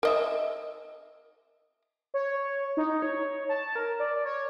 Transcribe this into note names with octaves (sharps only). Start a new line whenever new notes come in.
A#4 D#5 E5
C#5
D#4
C#5
A5
A#4
D5
C#5